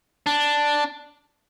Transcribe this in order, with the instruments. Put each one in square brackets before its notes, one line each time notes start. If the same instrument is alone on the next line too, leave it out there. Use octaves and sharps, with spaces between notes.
[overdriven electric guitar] D4